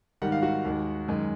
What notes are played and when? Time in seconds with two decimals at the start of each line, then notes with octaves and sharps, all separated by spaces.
0.22 G#2 D#3 G3 F#5
0.32 F5
0.43 F#4 F#5
0.65 D#2 D#3 G#3
1.08 F#2 D#3 G#3